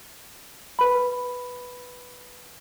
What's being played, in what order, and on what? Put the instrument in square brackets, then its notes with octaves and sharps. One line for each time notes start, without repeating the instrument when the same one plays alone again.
[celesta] B4 B5